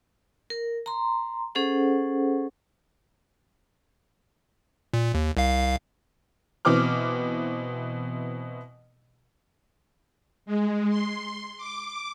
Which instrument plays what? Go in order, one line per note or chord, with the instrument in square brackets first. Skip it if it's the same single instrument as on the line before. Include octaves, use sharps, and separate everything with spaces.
[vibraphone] A#4
A#5 C6
C#4 G#4 A4 C5 F#5
[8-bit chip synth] A#2
D#2
C2 F5
[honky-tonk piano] B2 E3 C4 D6 F6
[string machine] G#3
C6
D6